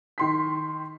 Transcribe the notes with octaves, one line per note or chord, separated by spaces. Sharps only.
D#3 C6 B6